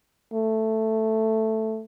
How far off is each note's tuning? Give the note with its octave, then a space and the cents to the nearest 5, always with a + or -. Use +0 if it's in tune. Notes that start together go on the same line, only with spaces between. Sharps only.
A3 +5